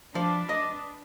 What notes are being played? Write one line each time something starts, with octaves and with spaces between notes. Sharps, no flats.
F3 D4 B4 D5
D5 D#5